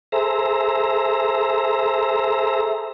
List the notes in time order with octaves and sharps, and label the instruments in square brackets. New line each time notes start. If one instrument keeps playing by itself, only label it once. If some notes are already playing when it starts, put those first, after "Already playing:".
[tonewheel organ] G#4 A4 C5 E5 A#5